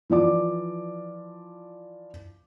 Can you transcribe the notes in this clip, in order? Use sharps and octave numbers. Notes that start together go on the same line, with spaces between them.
E3 F3 D5 D6